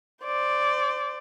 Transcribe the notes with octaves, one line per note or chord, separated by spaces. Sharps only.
C5 D5